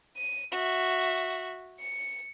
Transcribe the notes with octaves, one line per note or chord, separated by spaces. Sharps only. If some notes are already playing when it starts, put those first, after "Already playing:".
D#7
F#4 E5
C#7